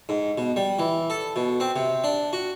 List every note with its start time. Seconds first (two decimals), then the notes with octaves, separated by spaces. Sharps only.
0.09 G#2
0.38 B2
0.56 G3
0.79 E3
1.10 A4
1.36 B2
1.60 C4
1.76 C3
2.04 D4
2.33 F#4